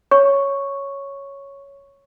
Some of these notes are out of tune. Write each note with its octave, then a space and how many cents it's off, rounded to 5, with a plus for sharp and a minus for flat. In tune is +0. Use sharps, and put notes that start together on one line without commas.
C#5 +0 C#6 +0